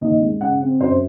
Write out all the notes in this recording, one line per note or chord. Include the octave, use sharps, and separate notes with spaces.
D#2 D#5
G#3
C#3 F#5
C4
F#2 C5